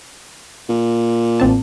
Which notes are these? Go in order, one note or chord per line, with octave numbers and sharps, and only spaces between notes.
A#2
A1 C4 A5